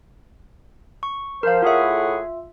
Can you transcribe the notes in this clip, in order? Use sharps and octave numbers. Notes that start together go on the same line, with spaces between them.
C#6
F3 A#4 C5 F5
A2 F4 G#4 E5 F#5